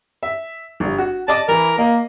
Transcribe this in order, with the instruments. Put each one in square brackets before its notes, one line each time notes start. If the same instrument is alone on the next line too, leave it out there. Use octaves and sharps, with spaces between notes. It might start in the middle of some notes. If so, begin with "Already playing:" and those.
[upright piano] E5
G1 G3
F#4
[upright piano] D5 D#5 D6 [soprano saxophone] A5
[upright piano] E3 E4 [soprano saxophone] A#4
[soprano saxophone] A#3 [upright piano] D#5